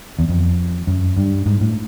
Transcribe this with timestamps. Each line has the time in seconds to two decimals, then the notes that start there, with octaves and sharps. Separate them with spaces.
0.19 E2
0.28 F2
0.87 F#2
1.17 G2
1.46 G#2
1.61 A2